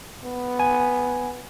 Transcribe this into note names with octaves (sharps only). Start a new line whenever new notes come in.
B3
G#5